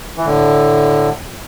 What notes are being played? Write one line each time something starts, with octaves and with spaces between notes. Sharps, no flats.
E3
A2 D3